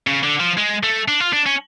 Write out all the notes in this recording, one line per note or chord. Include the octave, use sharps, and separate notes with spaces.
C#3
D3
F3
G#3
A3
D4
F4
D4
C#4